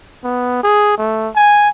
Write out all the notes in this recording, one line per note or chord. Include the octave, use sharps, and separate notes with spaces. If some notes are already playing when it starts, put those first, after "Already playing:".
B3
G#4
A3
G#5